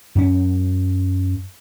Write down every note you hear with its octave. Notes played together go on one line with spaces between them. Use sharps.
F#2 C#4